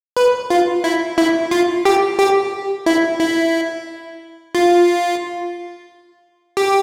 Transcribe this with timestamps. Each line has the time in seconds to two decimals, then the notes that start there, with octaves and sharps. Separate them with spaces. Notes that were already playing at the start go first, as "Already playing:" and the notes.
0.17 B4
0.50 F4
0.84 E4
1.18 E4
1.51 F4
1.85 G4
2.19 G4
2.86 E4
3.20 E4
4.55 F4
6.57 G4